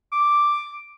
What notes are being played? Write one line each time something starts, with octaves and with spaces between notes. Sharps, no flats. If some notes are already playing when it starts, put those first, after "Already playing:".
D6